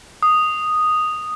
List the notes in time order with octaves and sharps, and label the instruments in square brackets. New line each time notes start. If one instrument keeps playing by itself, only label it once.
[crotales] D#6